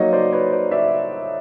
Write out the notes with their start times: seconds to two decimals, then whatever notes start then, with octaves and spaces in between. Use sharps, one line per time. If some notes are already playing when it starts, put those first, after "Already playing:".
Already playing: F#3 A#3 D#4 C#5 D#5
0.13 C5 D5
0.32 B4 C#5
0.52 C5 D5
0.71 D5 E5